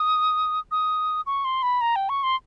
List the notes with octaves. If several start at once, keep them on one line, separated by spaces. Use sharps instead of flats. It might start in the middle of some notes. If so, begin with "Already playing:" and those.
Already playing: D#6
D#6
C#6
C6
B5
A#5
G5
C#6
C6